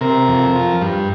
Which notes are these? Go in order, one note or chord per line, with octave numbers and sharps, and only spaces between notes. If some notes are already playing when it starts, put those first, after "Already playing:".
C3 A#4
F2
F3
G2